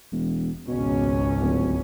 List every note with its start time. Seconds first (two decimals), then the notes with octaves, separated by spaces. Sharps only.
0.12 E1
0.68 G#1 C#2 B2 C#4
1.41 D1